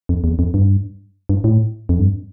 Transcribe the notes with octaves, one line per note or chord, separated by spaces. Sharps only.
F2
E2
F2
G2
G2
A2
F2
G2